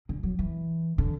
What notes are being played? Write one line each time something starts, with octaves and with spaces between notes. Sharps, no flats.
D3
F#3
E3
D3